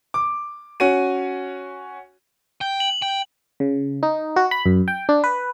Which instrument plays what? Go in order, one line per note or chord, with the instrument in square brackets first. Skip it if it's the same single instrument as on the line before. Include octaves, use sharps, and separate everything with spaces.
[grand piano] D6
C#4 F#4 D#7
[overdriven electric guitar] G5
[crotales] F#7
[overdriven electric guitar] G5
[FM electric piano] C#3
D#4
F#4
B5
F#2
G5
D4
B4